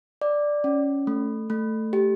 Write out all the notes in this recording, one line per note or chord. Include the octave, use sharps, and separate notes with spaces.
D5
C#4
A3
A3
G4